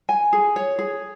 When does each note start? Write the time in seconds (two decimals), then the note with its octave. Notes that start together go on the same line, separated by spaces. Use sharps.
0.09 G#5
0.33 G#4
0.56 C#5
0.79 G#4